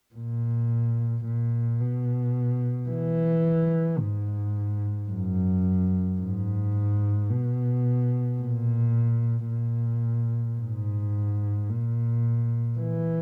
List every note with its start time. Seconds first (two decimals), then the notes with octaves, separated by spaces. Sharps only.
0.15 A#2
1.24 A#2
1.80 B2
2.89 E3
4.00 G#2
5.09 F#2
6.19 G#2
7.29 B2
8.39 A#2
9.49 A#2
10.59 G#2
11.69 A#2
12.79 E3